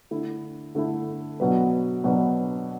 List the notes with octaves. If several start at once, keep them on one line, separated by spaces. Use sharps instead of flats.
D3 A3 E4
D3 A3 E4
B2 F#3 D4 B4
B2 F#3 D4 B4